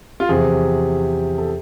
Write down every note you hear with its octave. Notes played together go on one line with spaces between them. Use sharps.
F4
E2 C3 F3 G#4
A4